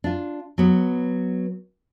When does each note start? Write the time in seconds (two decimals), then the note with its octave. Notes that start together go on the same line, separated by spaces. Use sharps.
0.04 D4 F4
0.58 F#3 B3